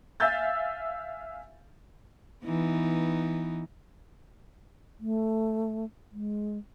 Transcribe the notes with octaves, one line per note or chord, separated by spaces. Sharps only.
E5 F5 G#5 E6 G6 A6
E3 B3 D#4
A3
G#3